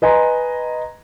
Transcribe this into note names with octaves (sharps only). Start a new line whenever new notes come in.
B4 D#5 G#5 A#5 C6